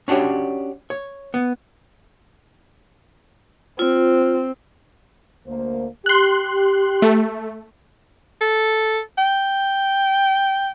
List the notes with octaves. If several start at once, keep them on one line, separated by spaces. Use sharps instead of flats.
C#4 D4 F#4 G4 C#5
C#5
B3
C4 F4
D2 A#3 C5
G4 C6 F#6
A3
A4
G5